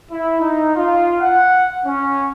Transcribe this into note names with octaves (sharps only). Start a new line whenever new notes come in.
E4
D#4
F4
F#5
C#4